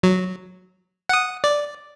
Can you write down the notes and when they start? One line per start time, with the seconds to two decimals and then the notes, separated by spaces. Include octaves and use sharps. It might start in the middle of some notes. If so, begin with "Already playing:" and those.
0.03 F#3
1.09 F#5 D#6
1.44 D5